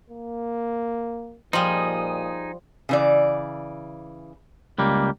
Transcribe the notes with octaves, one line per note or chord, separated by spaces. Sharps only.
A#3
A#2 F3 G3 D#4 G#4
C#3 E3 D5
C#2 G3 A#3